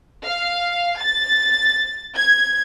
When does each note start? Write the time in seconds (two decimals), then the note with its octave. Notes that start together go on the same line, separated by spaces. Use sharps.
0.24 F5
0.99 A6
2.16 G#6